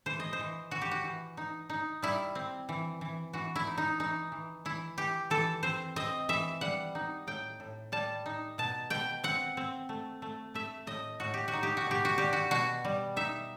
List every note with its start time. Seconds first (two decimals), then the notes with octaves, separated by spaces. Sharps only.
0.06 E3 C5
0.20 D#5
0.33 C5
0.40 E3
0.71 E3 F#4
0.82 G4
0.91 F#4
1.04 E3
1.37 D#4
1.70 D#4
2.02 G3 E4
2.35 C4
2.69 E3
3.01 E3
3.33 E3 F#4
3.56 E4
3.67 D#4
3.78 D#4
4.00 E3 D#4
4.32 E3
4.65 E3 E4
4.98 E3 G4
5.30 E3 A4
5.63 C4 C5
5.96 C4 D#5
6.29 E3 E5
6.61 G3 F#5
6.95 D#4
7.27 A2 G5
7.60 A2
7.92 G3 A5
8.26 D#4
8.58 B2 A5
8.90 B2 G5
9.24 C4 F#5
9.57 C4
9.89 A3
10.22 A3
10.54 A3 E5
10.87 A2 D#5
11.20 A2 F#4
11.34 G4
11.48 F#4
11.53 D#4
11.63 G4
11.77 F#4
11.86 B2 G4
12.05 F#4
12.18 G3 G4
12.33 F#4
12.51 B2 F#4
12.84 G3
13.16 D#4 E5